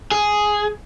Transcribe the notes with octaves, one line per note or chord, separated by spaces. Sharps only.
G#4